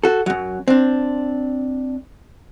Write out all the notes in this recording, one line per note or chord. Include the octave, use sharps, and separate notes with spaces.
F#4 A4
F#2 F#3
C4 D4